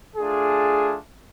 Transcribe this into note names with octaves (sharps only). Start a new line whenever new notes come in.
A3 D4 F4 G#4